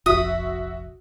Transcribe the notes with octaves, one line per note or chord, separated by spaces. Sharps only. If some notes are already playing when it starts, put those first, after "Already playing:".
F1 A#1 F2 F#4 E5 D#6